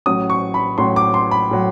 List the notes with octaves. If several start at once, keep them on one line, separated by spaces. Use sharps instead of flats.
A1 A2 F#3 D#6
C#6
B5
A1 A2 F#3 C6
D6
C6
B5
A2 F#3